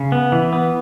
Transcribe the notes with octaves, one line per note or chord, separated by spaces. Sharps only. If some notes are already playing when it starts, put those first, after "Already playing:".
Already playing: C#3
B3
E3
B3